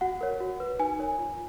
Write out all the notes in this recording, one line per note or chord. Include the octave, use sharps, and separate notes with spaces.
F#4 F#5
A#4 C#5
F#4
B4
D#4 G#5
A#4 C#5
F4